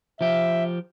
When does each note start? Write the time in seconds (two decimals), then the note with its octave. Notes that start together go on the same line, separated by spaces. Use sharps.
0.21 F3 G4 E5